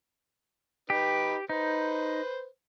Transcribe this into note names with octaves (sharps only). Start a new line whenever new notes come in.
D#4 G4 B4
D#4 B4 C5